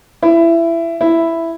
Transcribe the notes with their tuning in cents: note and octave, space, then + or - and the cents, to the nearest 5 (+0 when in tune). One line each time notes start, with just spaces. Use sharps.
E4 +20
E4 +5